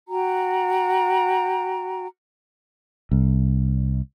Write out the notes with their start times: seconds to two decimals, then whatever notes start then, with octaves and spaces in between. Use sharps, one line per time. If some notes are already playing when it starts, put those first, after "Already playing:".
0.08 F#4 G5 A#5
3.11 C2